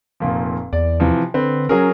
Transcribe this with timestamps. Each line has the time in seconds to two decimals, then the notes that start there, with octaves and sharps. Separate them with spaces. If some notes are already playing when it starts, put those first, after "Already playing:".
0.20 F1 A#2 F3
0.73 E2 D5
1.00 C3 E3 F3
1.34 D3 C4 B4
1.69 F#3 C#4 G#4 A#4